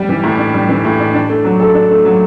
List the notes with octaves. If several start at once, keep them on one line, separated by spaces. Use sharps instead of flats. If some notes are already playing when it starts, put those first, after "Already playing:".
Already playing: G3
E3
A2
D4
G3
E3
A2
D4
D4
A3
F#3
A4
D4
A3
F#3